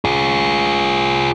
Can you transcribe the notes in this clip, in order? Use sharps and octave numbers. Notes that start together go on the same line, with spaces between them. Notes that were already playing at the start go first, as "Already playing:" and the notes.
F4 G#4